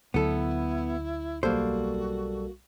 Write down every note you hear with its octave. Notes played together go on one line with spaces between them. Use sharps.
D2 D3 F#3 B3 E4 A4
B1 G3 A#3 F#4 A4 C5